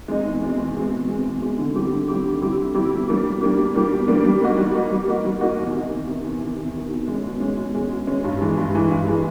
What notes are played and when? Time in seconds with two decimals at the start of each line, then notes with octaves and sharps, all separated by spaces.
0.08 G#3 C4 D#4
0.25 E2
0.42 B2 G#3 C4
0.58 E2
0.75 B2 G#3 C4
0.92 E2
1.08 B2 G#3 C4
1.25 E2
1.41 B2 G#3 C4
1.58 D3
1.75 G3 C4 E4 G4
1.92 D3
2.08 G3 C4 E4 G4
2.25 D3
2.41 G3 C4 E4 G4
2.58 D3
2.74 G3 C4 E4 G4
2.91 B2
3.08 G3 A#3 D4 G4
3.24 B2
3.41 G3 A#3 D4 G4
3.58 B2
3.74 G3 A#3 D4 G4
3.91 B2
4.08 G3 A#3 D4 G4
4.24 G3
4.41 A#3 D#4 F#4
4.58 G3
4.74 A#3 D#4 F#4
4.91 G3
5.08 A#3 D#4 F#4
5.25 G3
5.41 A#3 D#4 F#4
5.58 E2
5.74 C3 D#3
5.91 E2
6.08 C3 D#3
6.24 E2
6.41 C3 D#3
6.58 E2
6.74 C3 D#3
6.91 B2
7.07 G#3 C#4
7.24 B2
7.40 G#3 C#4
7.57 B2
7.74 G#3 C#4
7.91 B2
8.07 G#3 C#4
8.24 G2
8.41 E3 G#3
8.57 G2
8.74 E3 G#3
8.90 G2
9.07 E3 G#3